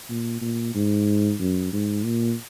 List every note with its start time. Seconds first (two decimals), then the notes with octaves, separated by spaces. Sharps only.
0.09 A#2
0.41 A#2
0.75 G#2
1.39 F#2
1.73 G#2
2.05 A#2